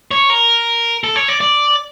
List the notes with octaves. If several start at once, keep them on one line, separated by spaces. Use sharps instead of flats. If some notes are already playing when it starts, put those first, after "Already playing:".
C#5
A#4
A4
C#5
D5
D5